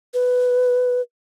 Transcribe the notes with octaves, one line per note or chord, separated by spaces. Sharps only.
B4